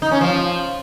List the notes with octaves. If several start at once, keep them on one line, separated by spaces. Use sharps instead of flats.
D#4
C#4
F3